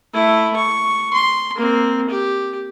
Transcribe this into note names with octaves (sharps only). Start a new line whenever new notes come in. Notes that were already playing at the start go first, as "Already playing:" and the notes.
A3 E4
C#6
C6
A#3 C4
G4